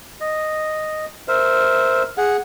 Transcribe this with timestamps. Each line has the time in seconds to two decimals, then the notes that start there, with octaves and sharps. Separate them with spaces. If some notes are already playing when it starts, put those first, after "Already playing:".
0.20 D#5
1.28 A#4 C5 E5
2.17 G#4 F#5